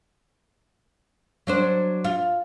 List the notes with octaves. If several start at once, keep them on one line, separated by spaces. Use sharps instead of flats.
F#3 D4 C5
F4